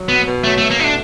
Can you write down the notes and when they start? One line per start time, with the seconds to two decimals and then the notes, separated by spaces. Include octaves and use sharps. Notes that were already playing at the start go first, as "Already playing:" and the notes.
Already playing: F#3
0.09 B2 B3
0.26 B2
0.44 F#3 A3
0.58 B2 A3
0.71 A#3
0.79 A3 D#4
0.84 D4